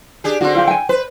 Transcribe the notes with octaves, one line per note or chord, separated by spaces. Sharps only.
D4 G4 G#4
D3 C4 F#4
F4 G4
G5 G#5
B4 C5